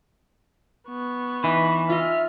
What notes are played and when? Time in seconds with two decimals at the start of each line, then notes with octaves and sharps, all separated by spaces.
0.88 B3 C#6
1.44 E3 D#4 B5
1.90 F4 D#5 E5 F6